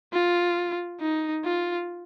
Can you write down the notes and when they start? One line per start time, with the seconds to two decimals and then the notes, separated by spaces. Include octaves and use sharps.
0.13 F4
1.00 D#4
1.44 F4